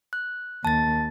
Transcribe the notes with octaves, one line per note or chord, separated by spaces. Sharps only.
F#6
D#2 A5 A6